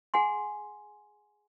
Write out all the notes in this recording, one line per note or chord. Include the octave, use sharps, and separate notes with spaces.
G#4 F#5 G#5 C6